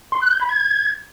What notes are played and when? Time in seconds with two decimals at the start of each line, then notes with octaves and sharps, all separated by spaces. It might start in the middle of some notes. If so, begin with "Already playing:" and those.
0.12 C6
0.21 F#6
0.30 G6
0.40 B5
0.49 G#6